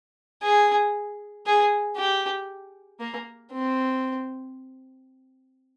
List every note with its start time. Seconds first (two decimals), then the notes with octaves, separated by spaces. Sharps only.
0.43 G#4
1.46 G#4
1.97 G4
3.00 A#3
3.52 C4